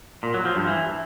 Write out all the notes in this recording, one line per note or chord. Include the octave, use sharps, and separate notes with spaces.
A#2
F#3
F3
G2
E3